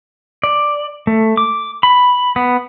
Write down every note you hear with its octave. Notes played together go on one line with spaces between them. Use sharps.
D5
A3
D6
B5
B3